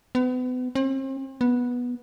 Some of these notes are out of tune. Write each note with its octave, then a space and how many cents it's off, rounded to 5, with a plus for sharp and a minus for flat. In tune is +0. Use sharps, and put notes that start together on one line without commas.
B3 +35
C4 +40
B3 -10